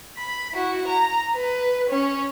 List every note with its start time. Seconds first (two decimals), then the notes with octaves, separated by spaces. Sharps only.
0.17 B5
0.53 E4 F#4
0.88 A#5
1.36 B4
1.90 C#4